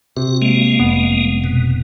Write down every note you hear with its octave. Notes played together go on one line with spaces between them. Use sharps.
C3 F#4
G#3 A#3
F1 B3
B2